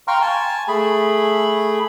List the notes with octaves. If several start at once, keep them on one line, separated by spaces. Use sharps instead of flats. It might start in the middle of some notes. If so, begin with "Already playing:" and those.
F5 G5 A#5 C6 C#6 F6
G#5 A5
A3 G#4 B5